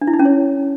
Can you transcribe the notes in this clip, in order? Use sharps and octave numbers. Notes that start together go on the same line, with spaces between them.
D4
E4
D#4
C#4
C#5